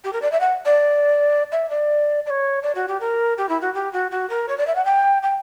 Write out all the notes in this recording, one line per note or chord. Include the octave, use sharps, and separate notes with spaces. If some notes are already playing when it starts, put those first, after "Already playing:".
G4
A#4
D5
E5
F#5
D5
E5
D5
D5
C#5
D5
F#4
G4
A#4
G4
E4
F#4
G4
F#4
F#4
A#4
C#5
D5
E5
F#5
G5
G5